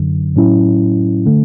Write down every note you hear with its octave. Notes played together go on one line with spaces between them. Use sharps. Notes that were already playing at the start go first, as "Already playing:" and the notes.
Already playing: F#2 D3 F#3
A2 F#3 C#4 E4
D3 A3